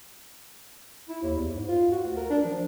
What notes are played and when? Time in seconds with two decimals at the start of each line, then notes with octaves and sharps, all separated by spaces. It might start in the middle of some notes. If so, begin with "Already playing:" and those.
1.09 E4
1.22 D#2
1.36 E2
1.54 G#2
1.69 F4
1.92 F#4
2.04 D2
2.17 A#4
2.30 D4
2.44 F3